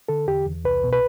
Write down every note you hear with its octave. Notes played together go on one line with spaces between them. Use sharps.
D3 A4
E2 G4
E2
C2 B4
B2
B4